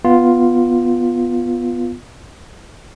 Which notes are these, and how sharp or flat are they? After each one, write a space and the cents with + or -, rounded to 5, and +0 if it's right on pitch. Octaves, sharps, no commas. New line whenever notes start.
B3 +0 F4 +0